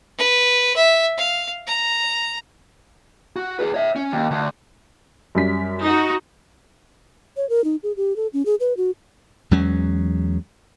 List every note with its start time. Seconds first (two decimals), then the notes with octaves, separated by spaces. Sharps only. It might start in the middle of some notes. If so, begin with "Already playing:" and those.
0.19 B4
0.76 E5
1.17 F5
1.67 A#5
3.36 F#4
3.59 G#4 B4
3.74 C#5 E5
3.96 C#4
4.12 D#2
4.31 D2
5.35 F#2 G3 B6
5.84 D#4 F#4
7.37 C#5
7.49 A#4
7.64 D#4
7.83 G#4
7.97 G4
8.16 A4
8.33 C#4
8.46 G#4
8.60 B4
8.77 F#4
9.51 E2 F#3 G#3 C#4